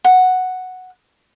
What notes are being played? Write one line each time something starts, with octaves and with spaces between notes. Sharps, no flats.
F#5